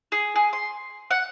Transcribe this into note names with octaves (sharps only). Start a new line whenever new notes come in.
G#4
G#4
C6
F#5